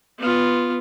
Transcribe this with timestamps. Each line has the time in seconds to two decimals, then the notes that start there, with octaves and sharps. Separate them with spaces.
0.18 B3 F4